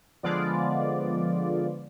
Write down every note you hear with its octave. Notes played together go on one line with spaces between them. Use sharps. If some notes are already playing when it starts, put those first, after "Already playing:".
D3 F3 G#3 B3 F4 D5